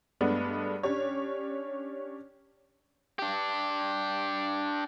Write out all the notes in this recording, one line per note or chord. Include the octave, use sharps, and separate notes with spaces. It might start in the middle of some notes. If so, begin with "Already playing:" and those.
G2 G#3 A3 B3 D4
C#4 D4 G4 C#5
D4 G4